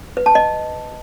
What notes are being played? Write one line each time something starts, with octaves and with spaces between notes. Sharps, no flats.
B4
A5
D#5